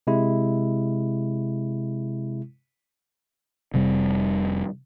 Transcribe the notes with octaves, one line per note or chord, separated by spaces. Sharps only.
C3 G#3 E4
F1 C3 G3